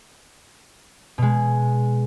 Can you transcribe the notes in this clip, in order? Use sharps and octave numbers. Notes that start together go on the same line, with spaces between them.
B2 G#3